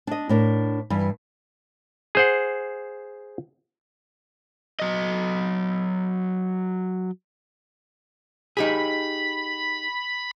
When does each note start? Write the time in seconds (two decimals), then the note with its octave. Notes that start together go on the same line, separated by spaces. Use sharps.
0.07 D4 D#5
0.29 A2 D4 A#4
0.90 G2 E3
2.15 G#4 C5 F#5
4.80 F#3 D#5
8.57 D#4 G4 G#4 B5